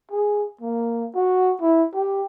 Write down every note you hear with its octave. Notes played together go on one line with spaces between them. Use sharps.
G#4
A#3
F#4
E4
G4